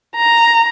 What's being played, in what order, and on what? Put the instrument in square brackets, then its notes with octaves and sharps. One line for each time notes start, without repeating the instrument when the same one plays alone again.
[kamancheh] A#5